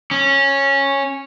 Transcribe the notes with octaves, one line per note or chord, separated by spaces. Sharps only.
C#4